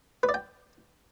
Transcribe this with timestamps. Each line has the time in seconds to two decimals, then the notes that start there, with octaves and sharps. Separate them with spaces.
0.23 B4
0.29 D5
0.34 G5